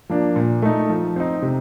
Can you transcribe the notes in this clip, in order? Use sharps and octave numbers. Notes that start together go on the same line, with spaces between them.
F3 A#3 D4
A#2
A3 D#4
F3
C4 D#4
C3